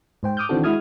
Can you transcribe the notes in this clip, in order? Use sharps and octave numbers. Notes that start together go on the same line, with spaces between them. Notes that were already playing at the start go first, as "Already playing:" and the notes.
G#2 C5 G5
D6 D#6 F6 G6
D#3 E3 C4 D4 F#4 A4
G#3 E4 F#4 D#6 F6 G#6